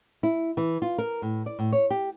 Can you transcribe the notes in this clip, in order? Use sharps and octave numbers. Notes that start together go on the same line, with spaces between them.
E4
E3
F4
A#4
A2
D5
A2
C#5
G4